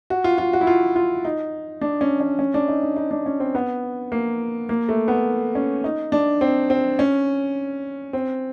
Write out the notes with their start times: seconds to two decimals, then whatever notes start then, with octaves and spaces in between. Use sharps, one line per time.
0.10 F#4
0.24 F4
0.38 F4
0.53 F#4
0.61 E4
0.67 F4
0.96 F4
1.25 D#4
1.81 D4
2.01 C#4
2.20 C#4
2.39 C#4
2.54 D4
2.68 D#4
2.82 D#4
2.96 D#4
3.11 D4
3.26 C#4
3.40 C4
3.55 B3
4.12 A#3
4.69 A#3
4.89 A3
5.08 B3
5.55 C#4
5.84 D#4
6.12 D4
6.41 C4
6.70 C4
6.99 C#4
8.13 C4